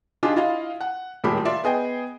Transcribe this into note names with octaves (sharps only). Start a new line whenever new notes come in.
D4 D#4 F4 G4 G#4
E4 F4 D#5 F5
F#5
D#1 A2 G#3 A#3 G4 B5
F4 D5 E5 C6
B3 G#4 D#5 G5